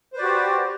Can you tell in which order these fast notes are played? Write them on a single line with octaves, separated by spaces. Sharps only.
C5 B4 D5 F#4 G4